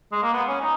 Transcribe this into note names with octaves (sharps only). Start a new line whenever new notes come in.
G#3
A#3
B3
C#4
D#4